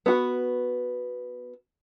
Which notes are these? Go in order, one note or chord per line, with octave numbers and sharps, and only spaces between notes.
B3 F#4